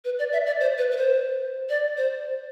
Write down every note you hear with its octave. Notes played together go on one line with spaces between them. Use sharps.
B4
D5
E5
D5
C5
B4
B4
C5
D5
C5